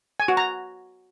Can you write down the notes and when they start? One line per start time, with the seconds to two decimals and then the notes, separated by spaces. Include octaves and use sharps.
0.20 G#5
0.28 F#4
0.37 A#5